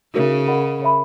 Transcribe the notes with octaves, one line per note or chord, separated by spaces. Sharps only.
C#3 D#4 F#4 A#4 C#5 E5
A#4 D#5 F#5 B5
A#4 C#5 E5 B5